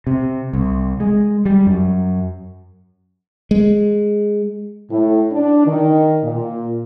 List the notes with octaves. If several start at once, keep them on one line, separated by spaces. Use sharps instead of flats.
C3
C2
G#3
G3
F#2
G#3
A2
D4
D#3
A#2